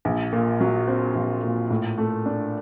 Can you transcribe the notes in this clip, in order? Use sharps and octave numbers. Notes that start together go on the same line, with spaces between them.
A#1
A#2
F#3
C4
A#1
A#2
A2
A3
D4